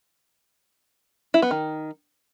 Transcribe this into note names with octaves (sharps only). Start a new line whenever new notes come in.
E4
B3
D#3